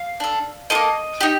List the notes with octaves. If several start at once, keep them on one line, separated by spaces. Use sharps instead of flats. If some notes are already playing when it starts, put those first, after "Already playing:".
Already playing: F5
D4 A4
A#3 F4 A4 D#5
D#4 G4